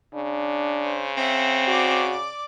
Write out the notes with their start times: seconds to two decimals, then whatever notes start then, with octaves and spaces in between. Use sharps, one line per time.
0.14 C#3 D4
0.80 C5
1.17 C4 E5 F#5
1.67 F#4 D5 D6